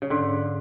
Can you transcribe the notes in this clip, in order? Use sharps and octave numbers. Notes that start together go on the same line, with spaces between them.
C#3
G#2 D3